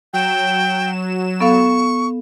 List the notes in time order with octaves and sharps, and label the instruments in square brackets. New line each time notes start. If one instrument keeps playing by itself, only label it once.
[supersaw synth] F#3 E7 [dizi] G5
[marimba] B3 A4 F5 [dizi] C#6